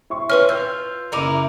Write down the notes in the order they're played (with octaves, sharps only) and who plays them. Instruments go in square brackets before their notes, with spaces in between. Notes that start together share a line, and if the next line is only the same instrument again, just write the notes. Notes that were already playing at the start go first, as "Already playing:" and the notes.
[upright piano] E4 C6 C#6
[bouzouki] C#4 F4 [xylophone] B4 F6
[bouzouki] F4 [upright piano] E6 G6
[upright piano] F#1 D6 F7 [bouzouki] D#4 E4 A#4